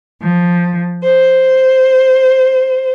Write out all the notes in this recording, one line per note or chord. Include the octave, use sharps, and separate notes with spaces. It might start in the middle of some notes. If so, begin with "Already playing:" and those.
F3
C5